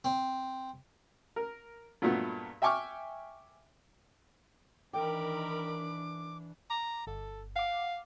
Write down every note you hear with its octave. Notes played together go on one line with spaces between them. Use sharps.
C4
A#4
G2 A#2 F#3 A3 B3
E5 G5 G#5 C#6 D6 F6
D#3 E3 D4 A#4 G5 B5 D6
A#5 D6
G1 A4
F5 F#5 D6